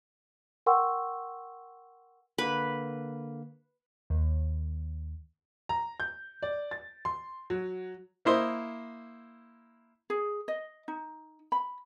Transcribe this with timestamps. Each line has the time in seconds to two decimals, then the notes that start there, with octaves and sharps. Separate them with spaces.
0.66 A#4 F#5 G5 C6 C#6 E6
2.38 D3 A#3 B4
4.10 D#2
5.69 A#5
6.00 G6
6.43 D5
6.71 A6
7.05 C6
7.50 F#3
8.25 A#3 E4 C5 D#5
10.10 G#4
10.48 D#5
10.88 D#4
11.52 B5